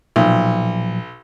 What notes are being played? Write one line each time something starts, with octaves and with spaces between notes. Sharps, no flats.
B1 A#2 F3 F#3